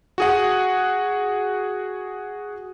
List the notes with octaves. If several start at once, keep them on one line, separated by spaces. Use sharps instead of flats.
F#4 G#4 F#5